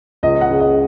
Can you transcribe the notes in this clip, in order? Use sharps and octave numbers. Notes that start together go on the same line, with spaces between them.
C#2 D#5
F#5
C#3
D#5